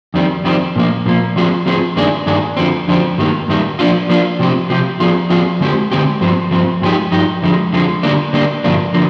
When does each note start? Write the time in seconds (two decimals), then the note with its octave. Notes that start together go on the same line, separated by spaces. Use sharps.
0.14 F2 D#3 G3 C4
0.44 F2 D#3 G3 C4
0.76 A#2 F3 A#3
1.06 A#2 F3 A#3
1.36 F3 C4 F4 G#4
1.66 F3 C4 F4 G#4
1.96 G2 D#3 A#3 D4 G#4
2.26 G2 D#3 A#3 D4 G#4
2.57 F2 D3 F3 C4
2.88 F2 D3 F3 C4
3.18 G2 D#3 G3 A#3
3.48 G2 D#3 G3 A#3
3.79 F3 A#3 D4 F4
4.09 F3 A#3 D4 F4
4.40 C3 F3 C4 G4
4.70 C3 F3 C4 G4
5.00 F3 C4 F4 G#4
5.30 F3 C4 F4 G#4
5.60 D3 G#3 C4 G4
5.91 D3 G#3 C4 G4
6.21 G2 F3 C4
6.51 G2 F3 C4
6.82 G2 F3 G#3 D#4 G4
7.12 G2 F3 D#4 G4
7.43 F2 D3 F3 G#3
7.73 F2 D3 F3 G#3
8.03 D3 G3 A#3 D4
8.33 D3 G3 A#3 D4
8.64 G2 D3 F3 A#3 D4
8.94 D3 F3 A#3